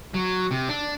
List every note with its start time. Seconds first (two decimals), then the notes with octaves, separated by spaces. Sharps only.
0.14 F#3
0.51 C3
0.69 D4